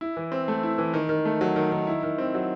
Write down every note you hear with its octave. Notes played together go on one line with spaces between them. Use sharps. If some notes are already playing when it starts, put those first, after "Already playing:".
E4
E3
C4
A3
E4
E3
D#3
D#3
A3
F#3
D#3
D#3
E4
D#3
C4
F#3